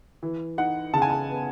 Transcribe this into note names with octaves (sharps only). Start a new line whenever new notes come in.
E3
D#4 F#5
C#3 A5
G#5
A5
B3